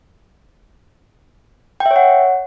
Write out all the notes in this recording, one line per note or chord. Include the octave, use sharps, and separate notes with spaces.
G5
E5
C#5
F#5